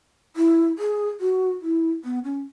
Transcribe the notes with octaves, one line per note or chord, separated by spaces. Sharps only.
E4
G#4
F#4
E4
B3
C#4